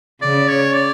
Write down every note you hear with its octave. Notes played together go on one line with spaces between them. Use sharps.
C#3 D5
C#5
D5